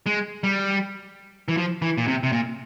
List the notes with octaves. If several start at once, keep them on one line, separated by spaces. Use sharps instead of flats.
G#3
G3
E3
F3
E3
A#2
C3
C3
A#2